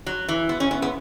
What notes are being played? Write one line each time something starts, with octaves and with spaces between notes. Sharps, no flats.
F#3
E3
B3
C#4
B3
B3